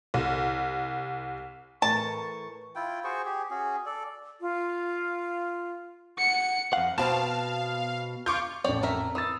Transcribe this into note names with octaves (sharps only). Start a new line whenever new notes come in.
C2
A2 E3 A#4 A5 C#6
E4 F4 G5
F#4 G#4 C5 C#6
G4 G#4
C#4 F#4 G#4
A4 D5
F4
F#5 C#7
F2 F5 F#5
B2 C4 B4 F5 A5
F4 C#6 D6 G6
A1 F2 C#5 D5 G5
A3 A#4 E5
E3 D#6 E6 A6